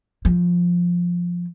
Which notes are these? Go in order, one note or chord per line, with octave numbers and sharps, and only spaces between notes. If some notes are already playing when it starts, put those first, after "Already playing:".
F3